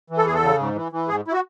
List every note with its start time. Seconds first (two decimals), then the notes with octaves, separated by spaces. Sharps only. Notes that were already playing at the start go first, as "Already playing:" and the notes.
0.10 E3
0.18 A4
0.26 E2 G#4
0.34 A4
0.43 C#3
0.59 G#2
0.75 E3
0.92 E3
1.08 G#2 G#4
1.28 E4
1.33 F#4